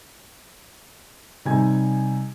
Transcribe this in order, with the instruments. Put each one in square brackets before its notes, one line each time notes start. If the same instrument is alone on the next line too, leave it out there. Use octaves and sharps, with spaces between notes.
[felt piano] C3 G3 D#4 G#5 G#6